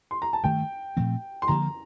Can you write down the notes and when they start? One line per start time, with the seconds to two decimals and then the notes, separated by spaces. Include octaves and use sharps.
0.11 C6
0.22 A#5
0.33 A5
0.43 G2 D#3 A3 G5
0.97 A#2 F3 A3 C4
1.42 C6
1.48 D3 F3 A#3 A#5